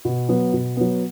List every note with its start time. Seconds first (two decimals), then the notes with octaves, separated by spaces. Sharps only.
0.05 B2
0.29 F#3 B3
0.53 B2
0.77 F#3 B3